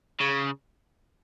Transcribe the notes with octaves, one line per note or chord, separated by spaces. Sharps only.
C#3